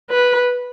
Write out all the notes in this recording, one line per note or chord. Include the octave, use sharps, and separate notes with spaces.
B4